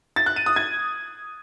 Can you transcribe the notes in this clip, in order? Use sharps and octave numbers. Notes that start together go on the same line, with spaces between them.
A6
F#6
D#7
D#6
G#6